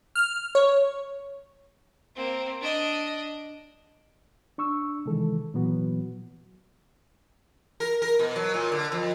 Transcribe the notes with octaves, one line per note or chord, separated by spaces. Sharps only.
F6
C#5
A#3 C4
D4 D#5
D4 C#6 E6
C3 D#3 E3 G#3 A4
A#2 E3 F#3 B3 F#4
A#4
A#4
B2
F#3
A#2
D3
F2